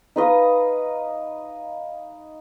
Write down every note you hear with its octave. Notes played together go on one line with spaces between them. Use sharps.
D#4 B4 D#5 F5